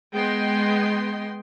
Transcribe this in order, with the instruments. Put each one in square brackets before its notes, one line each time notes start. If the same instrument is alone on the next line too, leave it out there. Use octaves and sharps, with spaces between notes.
[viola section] G#3 B3 D#5 G5 C6